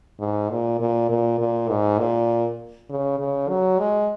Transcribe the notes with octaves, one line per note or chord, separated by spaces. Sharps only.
G#2
A#2
A#2
A#2
A#2
G#2
A#2
C#3
C#3
F#3
G#3